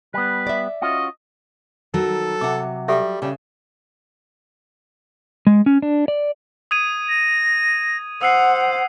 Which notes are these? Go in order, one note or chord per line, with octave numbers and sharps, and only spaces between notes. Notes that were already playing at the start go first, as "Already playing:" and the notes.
G3 B3 B4
D5 E5
C#4 F4 F#4 D#5
D#3 F#3 A4
C3 F#5 D6
G3 G4 A4 E5
C#3 G3
G#3
C#4
D4
D5
D#6 G#6 D#7
A#6
C5 F#5 D#6 E6 C7